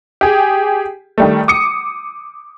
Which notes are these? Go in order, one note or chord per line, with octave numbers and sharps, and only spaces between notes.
G4 G#4
D#3 G3 A3
D6 D#6 C#7